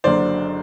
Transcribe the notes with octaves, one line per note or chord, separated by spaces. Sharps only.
F#1 F#2 D3 C5 D5